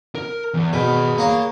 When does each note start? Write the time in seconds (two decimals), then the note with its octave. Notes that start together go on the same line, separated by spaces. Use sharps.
0.15 A#4
0.54 E2
0.73 B2 G#4 B5
1.18 A#3 C#5